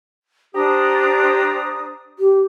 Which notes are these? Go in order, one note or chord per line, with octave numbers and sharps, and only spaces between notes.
D4 G4 C5 A#5 D#6
G4